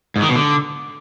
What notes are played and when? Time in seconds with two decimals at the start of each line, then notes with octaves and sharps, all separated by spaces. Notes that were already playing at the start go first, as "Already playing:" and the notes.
0.16 G#2
0.22 D#3
0.29 B2
0.36 D3